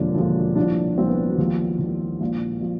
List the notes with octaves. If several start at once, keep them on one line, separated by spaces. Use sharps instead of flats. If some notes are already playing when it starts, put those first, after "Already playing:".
Already playing: E1 D#2 D3 F3 D4
E1 D#2 D3 F3
C2 A#2 F3 D4
C2 A#2 F3 C4
B3
F#3
D#2 D#3 F3
D#2 D#3
A#1 A#2 F3
A#2 F3